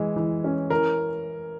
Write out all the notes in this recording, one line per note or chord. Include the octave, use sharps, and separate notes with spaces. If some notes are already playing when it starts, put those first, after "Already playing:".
Already playing: E3 G#3
E3
C#4
E3 A#4